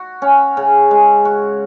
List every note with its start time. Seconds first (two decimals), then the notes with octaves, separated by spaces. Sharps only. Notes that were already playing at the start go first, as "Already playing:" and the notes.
Already playing: F#4
0.22 C#4
0.57 C#3
0.91 G#3
1.25 F#4